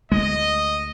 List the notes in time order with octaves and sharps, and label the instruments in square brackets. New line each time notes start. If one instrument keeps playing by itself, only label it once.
[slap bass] D2 G#3 [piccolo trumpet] D#5